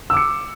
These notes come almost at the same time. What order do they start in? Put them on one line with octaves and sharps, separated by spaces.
E6 D6 C#7